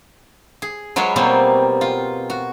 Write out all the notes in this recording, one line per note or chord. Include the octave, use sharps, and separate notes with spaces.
G#4
F#3 G#3 F4 B4 C#5
B2 F#3 G3 A#3 C4 F4
F4
F#4